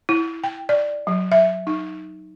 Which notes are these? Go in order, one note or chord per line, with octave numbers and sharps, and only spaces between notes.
E4
G5
D5
F#3
E5
D#4